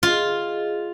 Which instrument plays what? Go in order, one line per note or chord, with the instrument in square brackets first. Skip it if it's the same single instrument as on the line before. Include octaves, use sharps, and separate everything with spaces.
[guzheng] F4 [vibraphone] G#4 D#5